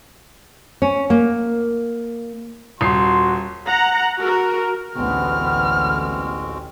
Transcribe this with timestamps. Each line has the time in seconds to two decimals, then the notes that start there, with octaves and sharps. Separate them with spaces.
0.82 C#4
1.10 A#3
2.81 D#1 F#4 C6 C7
3.66 F#5 A#5
4.21 F#4 A#4
4.95 A1 D2 G#3 B3 C4 F#4 F6